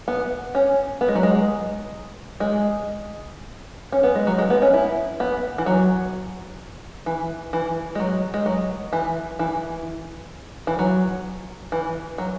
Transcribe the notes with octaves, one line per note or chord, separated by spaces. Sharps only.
B3
C#4
B3
G#3
F#3
G#3
G#3
C#4
B3
G#3
F#3
G#3
B3
C#4
E4
B3
E3
F#3
E3
E3
G#3
F#3
G#3
F#3
E3
E3
E3
F#3
E3
F#3